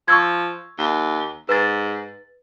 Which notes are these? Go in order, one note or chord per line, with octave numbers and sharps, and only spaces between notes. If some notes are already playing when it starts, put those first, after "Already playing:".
F3 C#6 E6 G#6
D#2
G#2 B4 A6